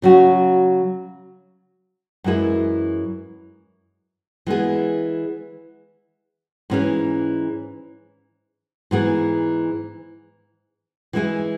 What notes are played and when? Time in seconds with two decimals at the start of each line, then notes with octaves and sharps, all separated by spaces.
0.02 C#3 F#3 C#4 F#4
2.24 F#2 E3 G#3 E4 G#4
4.46 E3 G#3 B3 G#4
6.70 G#2 E3 C#4 G#4
8.91 G#2 E3 B3 G#4
11.13 E3 G#3 E4 G#4